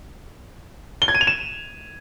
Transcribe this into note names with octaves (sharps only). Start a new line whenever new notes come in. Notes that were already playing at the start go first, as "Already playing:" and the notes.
G7
G#6
D#7
F7
E7